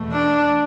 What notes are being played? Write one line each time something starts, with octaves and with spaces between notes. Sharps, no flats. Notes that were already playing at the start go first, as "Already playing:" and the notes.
Already playing: E2 B2 A3
D4